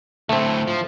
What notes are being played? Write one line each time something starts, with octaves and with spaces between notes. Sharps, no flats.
D2 A2 A3 C4
F3